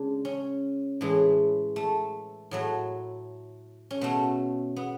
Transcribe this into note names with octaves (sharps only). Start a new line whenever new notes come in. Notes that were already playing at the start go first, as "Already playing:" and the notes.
Already playing: C#3 G#3 D4
C#4
A2 E3 G#3
A3
A2 F#3 A3
C#4
B2 A3 B3
B3